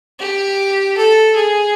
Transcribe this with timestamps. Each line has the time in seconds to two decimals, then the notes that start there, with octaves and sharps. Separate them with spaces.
0.20 G4
0.97 A4
1.35 G#4